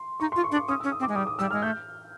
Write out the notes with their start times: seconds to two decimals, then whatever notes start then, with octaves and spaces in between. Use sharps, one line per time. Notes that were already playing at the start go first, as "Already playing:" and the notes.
Already playing: C6
0.20 D#4 C#6
0.32 C6
0.36 F4
0.44 C#6
0.51 D4
0.56 D6
0.68 C#4 D#6
0.80 E6
0.84 C#4
0.92 D#6
1.00 C4
1.03 D6
1.09 G#3
1.15 G3 D#6
1.27 D#6
1.39 G3 E6
1.51 G#3 F6
1.62 A3 G6